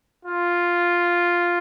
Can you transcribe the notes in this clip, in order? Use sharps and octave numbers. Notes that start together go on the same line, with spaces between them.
F4